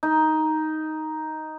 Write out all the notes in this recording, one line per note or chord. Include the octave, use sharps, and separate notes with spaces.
D#4